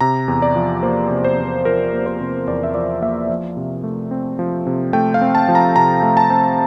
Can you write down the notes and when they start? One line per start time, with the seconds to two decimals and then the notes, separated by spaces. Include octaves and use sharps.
0.01 C3 A#5
0.28 E2
0.42 D5
0.56 F3
0.83 A#3 C5
1.11 C3
1.24 C5
1.38 E2
1.65 F3 A#4
1.92 A#3
2.06 C5
2.20 C3
2.47 E2 D5
2.63 E5
2.74 F3 D5
3.02 A#3 E5
3.29 F3
3.57 C3
3.83 A3
4.11 C4
4.39 F3
4.67 C3
4.93 A3 G5
5.14 F5
5.21 C4
5.35 A5
5.48 F3
5.55 A#5
5.76 C3 A#5
6.03 A3
6.17 A5
6.30 C4